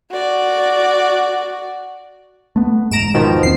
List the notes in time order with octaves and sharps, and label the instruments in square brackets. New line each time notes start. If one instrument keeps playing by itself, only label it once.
[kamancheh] F#4 D5
[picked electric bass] A3 B3
[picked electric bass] E1 G#2 [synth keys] A#5 D7 E7
[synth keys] B2 D#3 F3
[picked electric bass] E2 C4 [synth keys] C7